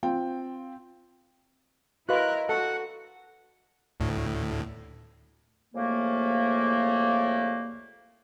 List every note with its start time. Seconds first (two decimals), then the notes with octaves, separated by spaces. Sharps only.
0.03 C4 F4 G5
2.09 E4 F#4 A#4 B4 D#5 F5 C6 F#6
2.49 F#4 A4 F#5 A5
4.00 D2 A2
5.75 C2 F2 C#3 A3 A#3